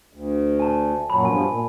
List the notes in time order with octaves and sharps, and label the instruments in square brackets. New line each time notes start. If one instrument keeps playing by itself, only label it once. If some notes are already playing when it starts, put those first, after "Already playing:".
[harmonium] D2
[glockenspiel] G#5 A5
[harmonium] F#2 A#2 F#3 [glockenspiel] B5
[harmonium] G2 B2 F3 [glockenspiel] G#5 B5
[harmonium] A#2